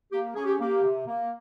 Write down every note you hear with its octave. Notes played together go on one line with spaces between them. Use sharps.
A#3 G4
C#4 G#4
G4
G#4
A#3 G4
C3
A#3